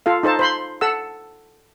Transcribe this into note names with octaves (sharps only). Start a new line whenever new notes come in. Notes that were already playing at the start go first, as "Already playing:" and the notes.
F4 A4 F5
D#4 A4 C5 A5
C5 B5 C6
A4 F#5 E6